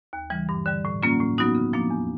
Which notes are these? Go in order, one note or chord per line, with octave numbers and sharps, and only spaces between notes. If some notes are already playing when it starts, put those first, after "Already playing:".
D#2
C#3 E3 G3
G2
D3 G3
A2
F#3 A#3 C#4 F4
A2
F#3 B3 D#4 F#4
C#3
F3 A#3 D4
E2